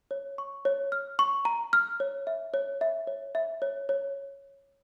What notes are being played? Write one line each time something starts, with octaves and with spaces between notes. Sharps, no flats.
C#5
C#6
C#5
F6
C#6
A#5
F6
C#5
E5
C#5
E5
C#5
E5
C#5
C#5